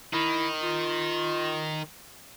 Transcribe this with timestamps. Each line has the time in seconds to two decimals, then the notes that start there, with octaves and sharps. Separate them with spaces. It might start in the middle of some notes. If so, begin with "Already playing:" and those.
0.13 D#3 D#4 E4
0.62 F4